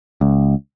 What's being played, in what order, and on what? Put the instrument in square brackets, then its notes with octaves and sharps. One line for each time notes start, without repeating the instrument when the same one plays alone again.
[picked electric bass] C#2